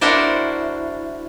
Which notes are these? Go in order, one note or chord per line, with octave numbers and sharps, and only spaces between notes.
D4 E4 F#4 A#4 C5 D5